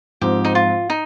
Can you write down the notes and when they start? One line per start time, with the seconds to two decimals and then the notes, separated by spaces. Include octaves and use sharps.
0.21 G#2 F3 C4 G4
0.45 D#4
0.55 F4
0.90 D#4